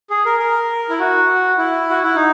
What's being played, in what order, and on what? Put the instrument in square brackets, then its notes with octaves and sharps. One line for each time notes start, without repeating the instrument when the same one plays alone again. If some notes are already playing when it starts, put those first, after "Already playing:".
[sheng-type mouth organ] G#4
A#4
A#4
E4
F#4
E4
F#4
E4
D#4